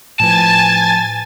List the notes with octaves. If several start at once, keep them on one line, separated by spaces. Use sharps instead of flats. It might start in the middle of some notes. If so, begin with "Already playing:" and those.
A2 F3 B4 G#5 A5 A6